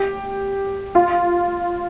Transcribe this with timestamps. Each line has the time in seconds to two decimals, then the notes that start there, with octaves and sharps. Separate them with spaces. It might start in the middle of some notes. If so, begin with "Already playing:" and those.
Already playing: G4
0.95 F4